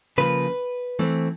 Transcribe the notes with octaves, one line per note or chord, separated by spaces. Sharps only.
C#3 F3 A#3 B4
E3 A3 C4